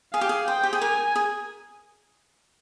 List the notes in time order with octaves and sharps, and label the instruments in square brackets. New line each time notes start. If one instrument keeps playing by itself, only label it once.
[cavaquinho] G#4 [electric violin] F5
[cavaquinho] G4
G#4
[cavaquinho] C5 [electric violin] G5
[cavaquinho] G4
G#4
[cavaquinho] A#4 [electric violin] G#5
[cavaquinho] G#4